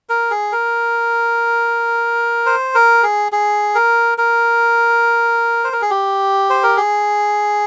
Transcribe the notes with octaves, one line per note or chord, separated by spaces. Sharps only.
A#4
G#4
A#4
C5
A#4
G#4
G#4
A#4
A#4
C5
A#4
G#4
G4
C5
A#4
G#4